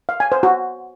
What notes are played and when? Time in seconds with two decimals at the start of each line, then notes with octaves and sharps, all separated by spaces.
0.09 F5
0.20 G#5
0.32 C5
0.43 F#4